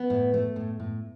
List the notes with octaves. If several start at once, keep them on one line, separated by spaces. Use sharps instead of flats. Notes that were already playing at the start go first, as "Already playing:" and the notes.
Already playing: B3
A2
A3
A2
A2